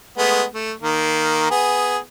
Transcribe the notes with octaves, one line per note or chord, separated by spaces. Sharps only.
G#3 A3 B3
A3
D#3 A#3
B3 G#4